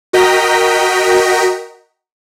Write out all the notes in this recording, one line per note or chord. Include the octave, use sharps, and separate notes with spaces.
F#4 A#4 D#5 G5 A#5 B6